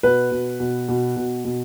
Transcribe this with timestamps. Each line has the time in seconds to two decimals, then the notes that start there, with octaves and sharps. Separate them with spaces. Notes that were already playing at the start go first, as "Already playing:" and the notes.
0.03 B2 B4
0.32 B2
0.60 B2
0.89 B2
1.16 B2
1.45 B2